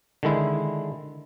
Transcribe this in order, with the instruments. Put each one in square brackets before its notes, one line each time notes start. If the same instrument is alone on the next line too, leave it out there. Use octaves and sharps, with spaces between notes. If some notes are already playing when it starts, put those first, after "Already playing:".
[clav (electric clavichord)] D3 D#3 G#3 E4